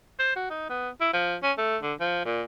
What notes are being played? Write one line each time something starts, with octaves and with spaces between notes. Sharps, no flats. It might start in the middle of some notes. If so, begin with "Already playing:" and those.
C5
F#4
D#4
B3
E4
F3
C#4
A3
D3
F3
A#2